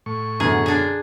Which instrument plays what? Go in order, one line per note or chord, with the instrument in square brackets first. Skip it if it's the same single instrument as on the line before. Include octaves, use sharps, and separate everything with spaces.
[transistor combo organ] A2 C#6
[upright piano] F#2 B2 D3 [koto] G#4
[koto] D4 G#4